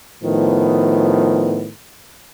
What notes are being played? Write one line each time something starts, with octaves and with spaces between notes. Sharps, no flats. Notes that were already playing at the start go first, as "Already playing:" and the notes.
A2 D#3 F3 B3